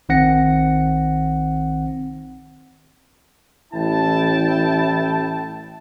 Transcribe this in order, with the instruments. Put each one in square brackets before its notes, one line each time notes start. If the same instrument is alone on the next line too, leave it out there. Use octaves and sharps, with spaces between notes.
[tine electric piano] A#1 D#3 C4 F#5 A#6 C#7
[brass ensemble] A1 E4 G5 A5